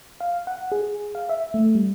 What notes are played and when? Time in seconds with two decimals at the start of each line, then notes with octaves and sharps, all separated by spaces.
0.21 F5
0.47 F#5
0.72 G#4
1.15 F5
1.29 E5
1.54 A3
1.75 G3